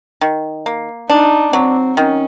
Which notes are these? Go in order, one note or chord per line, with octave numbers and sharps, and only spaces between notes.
D#3
A#3
D4 D#4
F#3 C4
D#3 C#4